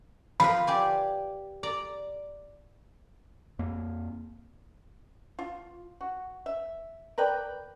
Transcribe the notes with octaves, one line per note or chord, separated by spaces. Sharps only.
F3 A#4 B4 B5
G4 D5 G#5
D5 A#5
F2 A#3
F4
F#4
E5
A#4 B4 D5 G5